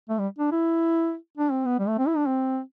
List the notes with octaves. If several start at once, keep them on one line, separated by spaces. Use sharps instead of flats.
A3
G3
D4
E4
D4
C4
B3
G3
A3
C4
E4
D4
C4